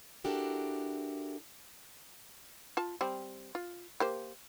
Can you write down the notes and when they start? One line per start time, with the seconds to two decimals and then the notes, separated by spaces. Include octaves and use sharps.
0.24 D4 E4 F#4 G4 A4 A#4
2.77 F4 A5
3.01 G3 C4
3.55 F4
4.00 A#3 G4 C5